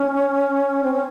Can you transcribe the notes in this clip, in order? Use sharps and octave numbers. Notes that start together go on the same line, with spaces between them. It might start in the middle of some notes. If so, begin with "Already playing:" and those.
Already playing: C#4
C4
C#4